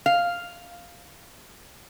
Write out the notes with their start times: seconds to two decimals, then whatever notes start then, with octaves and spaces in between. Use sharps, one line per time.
0.06 F5